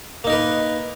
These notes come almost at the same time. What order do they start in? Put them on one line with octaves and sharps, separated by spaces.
A#3 D#4 A#4 B4